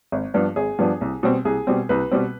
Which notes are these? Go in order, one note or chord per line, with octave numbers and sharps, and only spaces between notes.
G#1
G2 F3 B3 D4
G#1 G#4
G2 F3 B3 D4
C2
B2 G3 C4
C2 G#4
B2 G3 C4
C2 B4
B2 G3 C4